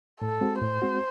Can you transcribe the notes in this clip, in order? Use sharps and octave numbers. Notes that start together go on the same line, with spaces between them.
A2 A4
G#3 C4 F#4
A2 C5
G#3 C4 F#4